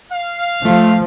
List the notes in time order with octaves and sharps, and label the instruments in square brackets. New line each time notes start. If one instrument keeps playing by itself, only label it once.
[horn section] F5
[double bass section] F3 [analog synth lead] A3